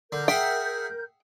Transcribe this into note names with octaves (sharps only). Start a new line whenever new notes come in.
D3 A#4 G6
G#4 E5 F#5 G5